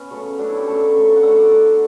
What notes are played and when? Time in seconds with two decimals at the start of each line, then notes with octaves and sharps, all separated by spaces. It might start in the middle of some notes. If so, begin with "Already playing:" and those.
Already playing: B3 C#4
0.11 C#3 F#3 A3
0.38 C#3 F#3 A3 D4
0.48 E4
0.57 G4
0.67 C#3 F#3 A3 A4
0.81 E5
0.95 C#3 F#3 A3
1.16 F#5
1.23 D3 A3 E5
1.37 D5
1.51 D3 A3